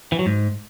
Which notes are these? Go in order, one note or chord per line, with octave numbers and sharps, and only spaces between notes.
E3
F#3
G#2